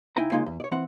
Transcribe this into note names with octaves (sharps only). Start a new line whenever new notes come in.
C#2 D#4 E4 G5 G#5 A#5
C#3 G#3 A#3 D#4 F4
E2
C#5 D5
E3 C4 F#5